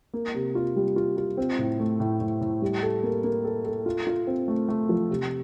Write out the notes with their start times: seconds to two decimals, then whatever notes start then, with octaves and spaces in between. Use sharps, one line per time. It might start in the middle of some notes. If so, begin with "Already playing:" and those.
0.14 A#3
0.34 C3
0.55 F4
0.76 G3
0.96 F4
1.17 F4
1.37 C4
1.59 A2
1.79 A3
2.00 A2
2.20 A2
2.41 A2
2.62 G3
2.83 A4
3.03 A#3
3.24 A#3
3.44 A4
3.65 A4
3.86 F4
4.07 F4
4.27 C4
4.48 A3
4.68 A3
4.89 F3
5.10 C3